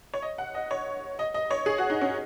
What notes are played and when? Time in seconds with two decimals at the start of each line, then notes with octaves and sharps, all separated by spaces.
0.14 C#5
0.22 D#5
0.38 F#5
0.55 D#5
0.71 C#5
1.19 D#5
1.34 D#5
1.51 C#5
1.66 G#4
1.78 F#4
1.90 D#4
2.01 C#4